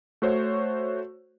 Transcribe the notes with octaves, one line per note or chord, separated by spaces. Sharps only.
A3 F#4 C5 C#5